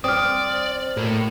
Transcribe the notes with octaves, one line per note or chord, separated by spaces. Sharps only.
C4 D5 D#6 F6
A2 A#3